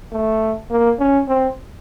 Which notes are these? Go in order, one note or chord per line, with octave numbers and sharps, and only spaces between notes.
A3
A#3
C#4
C4